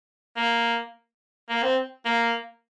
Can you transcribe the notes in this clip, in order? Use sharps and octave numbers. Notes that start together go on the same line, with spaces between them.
A#3
A#3
C4
A#3